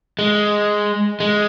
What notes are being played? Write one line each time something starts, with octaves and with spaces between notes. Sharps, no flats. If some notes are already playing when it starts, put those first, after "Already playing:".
G#3
G#3